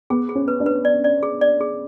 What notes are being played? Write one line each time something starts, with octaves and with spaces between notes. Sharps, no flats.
B3 G#4
G#4
C#4
B4
D4
B4
D5
D5
G#4
D5
G#4